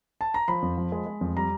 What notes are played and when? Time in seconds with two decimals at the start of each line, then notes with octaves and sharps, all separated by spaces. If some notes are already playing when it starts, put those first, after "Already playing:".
0.21 A5
0.34 A#5
0.48 F3 B5
0.62 F2
0.78 F3
0.92 G#3
1.07 G#3
1.21 F2
1.36 G3 A#5